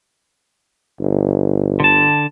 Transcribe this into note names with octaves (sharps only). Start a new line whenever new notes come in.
G1
D3 A5